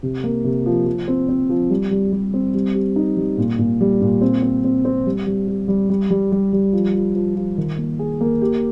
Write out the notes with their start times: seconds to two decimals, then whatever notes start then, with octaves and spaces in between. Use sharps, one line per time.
0.03 C3
0.24 A#3
0.44 C3
0.66 F3
0.86 F3
1.08 C4
1.29 C4
1.49 F3
1.70 G3
1.91 G3
2.12 G3
2.34 C4
2.54 G3
2.75 G4
2.96 D#4
3.17 G3
3.38 A#2
3.59 A#2
3.81 G3
4.01 A#2
4.21 C4
4.43 C4
4.64 C4
4.85 C4
5.06 G3
5.26 G3
5.48 G4
5.68 G3
5.90 G3
6.10 G3
6.32 G3
6.53 G3
6.73 F3
6.95 F3
7.15 F3
7.36 F3
7.58 D#3
7.78 A#3
7.99 G#4
8.21 A#3
8.42 G4